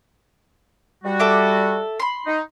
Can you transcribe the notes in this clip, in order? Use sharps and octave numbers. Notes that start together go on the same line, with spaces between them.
G3 F#4
A4 E5 D6
B5 C6
D#4